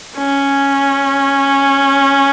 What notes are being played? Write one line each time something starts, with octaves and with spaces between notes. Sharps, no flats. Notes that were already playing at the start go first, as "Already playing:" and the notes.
C#4